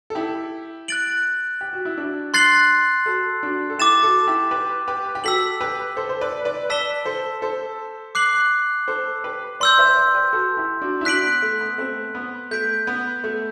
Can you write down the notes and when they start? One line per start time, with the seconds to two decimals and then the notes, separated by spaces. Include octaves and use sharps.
0.10 A4
0.15 E4 G4
0.88 F#6 A6 D7 F#7
1.61 G4
1.73 F#4
1.85 E4
1.97 D4 F#4
2.34 C6 F#6 A6 C7 F#7
3.06 F#4 A4
3.43 D4 F#4
3.70 A4
3.79 E4 G4 D6 A6 E7
4.03 F#4 A4
4.27 E4 G4
4.51 G4 B4
4.88 G4 B4
5.15 G4
5.24 F#4 A4 E6 B6 F#7
5.61 G4 B4
5.97 A4 C5
6.09 C5
6.21 B4 D5
6.45 B4 D5
6.70 B4 D5 A5 E6 B6 E7 G7
7.05 A4 C5
7.42 A4 C5
8.15 D6 F#6 C7 F#7
8.88 A4 C5
9.24 G4 B4
9.60 B4 D5 C6 E6 G6
9.78 C5 E5
9.88 C5
9.96 B4 D5
10.15 G4 B4
10.33 F#4 A4
10.57 E4 G4
10.82 D4 F#4
11.01 E4
11.05 D4 F#4 F#6 B6 D7 F#7
11.24 B3
11.42 A3
11.60 B3
11.78 A3 C4
12.15 B3
12.51 A3 G6 B6 D7
12.87 B3
13.24 A3